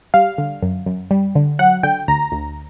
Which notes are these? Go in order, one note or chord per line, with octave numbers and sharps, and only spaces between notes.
G3 F5
D3
F#2
F#2
G3
D3
F#3 F#5
D3 G5
D2 A#5
D2